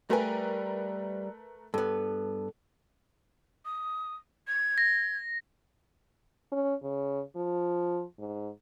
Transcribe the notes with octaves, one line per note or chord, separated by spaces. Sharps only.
G3 A3 A#4 B4 G#5
G2 B3 A4
D#6
G#6
A#6
C#4
C#3
F3
G#2